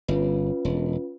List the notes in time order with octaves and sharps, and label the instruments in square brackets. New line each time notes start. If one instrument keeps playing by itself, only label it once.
[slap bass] G1 [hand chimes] C#4 F4 B4
[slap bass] E1